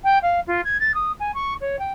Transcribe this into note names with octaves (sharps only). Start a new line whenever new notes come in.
G5
F5
F4
G#6
A6
D#6
G#5
C#6
C#5
G5